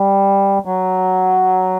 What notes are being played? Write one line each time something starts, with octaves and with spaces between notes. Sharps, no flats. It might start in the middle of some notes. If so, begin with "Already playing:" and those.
Already playing: G3
F#3